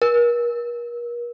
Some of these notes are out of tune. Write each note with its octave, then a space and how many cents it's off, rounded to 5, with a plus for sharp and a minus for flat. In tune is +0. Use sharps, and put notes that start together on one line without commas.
A#4 +40